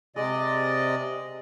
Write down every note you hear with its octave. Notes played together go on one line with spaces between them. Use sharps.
C3 G#3 D5 D#5